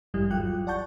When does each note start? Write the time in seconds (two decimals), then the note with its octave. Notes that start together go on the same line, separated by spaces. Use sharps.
0.14 A1 G2 G3 E4
0.30 G#1 E2 F#3 F4 G5 F#6
0.66 G#1 D5 F#5 A5 C#6 G6